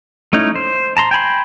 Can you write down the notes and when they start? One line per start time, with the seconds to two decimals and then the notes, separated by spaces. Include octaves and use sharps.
0.33 A3 C#4 D#4 E4
0.56 C5
0.97 A5 A#5 C6
1.11 G5 G#5 B5 C6